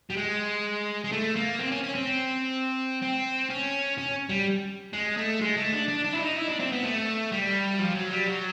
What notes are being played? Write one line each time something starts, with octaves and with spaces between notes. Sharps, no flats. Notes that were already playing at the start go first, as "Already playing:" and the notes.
G3
G#3
G#3
A3
A#3
C4
C#4
C#4
C4
C4
C#4
C#4
G3
G#3
A3
G#3
A3
D4
D4
D4
E4
D#4
E4
D4
C4
B3
A3
G3
F3
F#3
G3
F#3